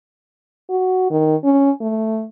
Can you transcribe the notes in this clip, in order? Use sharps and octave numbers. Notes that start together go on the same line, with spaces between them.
F#4
D#3
C#4
A3